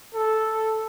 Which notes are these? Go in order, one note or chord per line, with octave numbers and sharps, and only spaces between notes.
A4